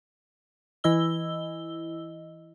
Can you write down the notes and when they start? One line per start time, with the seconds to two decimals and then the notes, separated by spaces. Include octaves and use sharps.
0.84 E3 E4 D#5 E6 G7